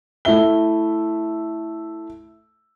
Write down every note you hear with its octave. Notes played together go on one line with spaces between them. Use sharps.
A3 E4 E5 G7